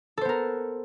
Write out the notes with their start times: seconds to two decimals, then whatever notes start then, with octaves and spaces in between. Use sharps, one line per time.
0.17 A4
0.21 C5
0.25 B3
0.29 A#4